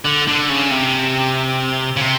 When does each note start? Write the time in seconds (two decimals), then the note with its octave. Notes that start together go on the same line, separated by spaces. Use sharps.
0.05 D3
0.27 D3
0.49 C#3
0.71 C3
1.96 C#3
2.01 C3